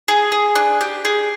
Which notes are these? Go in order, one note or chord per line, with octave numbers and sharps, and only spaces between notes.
G#4
G#4
D4
G4
G#4